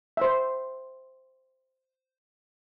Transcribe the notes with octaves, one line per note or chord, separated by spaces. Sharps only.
C5 E5